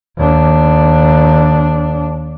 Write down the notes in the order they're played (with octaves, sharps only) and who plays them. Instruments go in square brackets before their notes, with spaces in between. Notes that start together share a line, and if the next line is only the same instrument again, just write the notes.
[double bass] D#2 D4